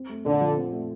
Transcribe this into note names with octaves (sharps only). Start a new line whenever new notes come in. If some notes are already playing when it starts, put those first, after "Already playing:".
Already playing: C4
A3
A#2 D3
F3
C4
A3